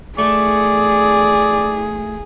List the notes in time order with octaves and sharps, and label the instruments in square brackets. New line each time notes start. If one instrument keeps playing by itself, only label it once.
[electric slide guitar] A3 [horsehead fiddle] G#4 [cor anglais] D5